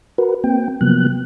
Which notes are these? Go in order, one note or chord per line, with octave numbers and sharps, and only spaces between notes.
F#4 A#4 B4
A#3 C4 G5
C3 F3 F#3 A#3 B3 F#6